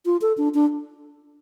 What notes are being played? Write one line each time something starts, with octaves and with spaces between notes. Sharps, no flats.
F4
A4
D4
D4